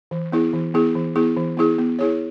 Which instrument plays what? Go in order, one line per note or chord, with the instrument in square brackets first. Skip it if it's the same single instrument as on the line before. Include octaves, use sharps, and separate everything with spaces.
[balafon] E3
B3 E4 G#4
E3
B3 E4 G#4
E3
B3 E4 G#4
E3
B3 E4 G#4
B3
E4 G#4 C#5